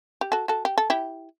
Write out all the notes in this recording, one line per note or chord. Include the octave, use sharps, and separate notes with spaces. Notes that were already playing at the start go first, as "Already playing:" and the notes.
G4
F#4 A4
F#4 A4
G4
A4
E4 G4